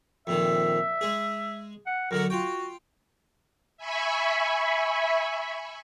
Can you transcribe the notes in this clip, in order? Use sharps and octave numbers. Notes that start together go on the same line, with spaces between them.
F2 A#2 D#3 E5
G#3 G#4
F#5
F#2 D3 F#4 A#4
F4 F#4 G5
E5 G#5 B5 C#6